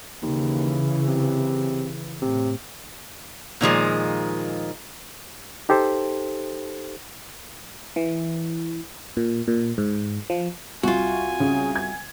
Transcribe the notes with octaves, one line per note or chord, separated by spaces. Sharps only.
D#2 C#3 E3
C3
A2 C3
A#2 D#3 F3 G#3
D#4 G4 A4 C5
E3
A#2
A#2
G#2
F3
C2 F4 F#4 F#5 G#5 C#6
C#3
G#6